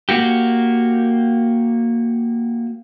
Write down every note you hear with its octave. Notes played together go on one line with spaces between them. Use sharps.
A#3 F#4 G4